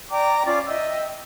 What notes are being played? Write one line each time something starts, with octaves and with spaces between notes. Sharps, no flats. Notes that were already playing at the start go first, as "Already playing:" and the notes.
D5 G5 A#5 D6
C#4 F4 D5 D6
D#5 E5 G5 E6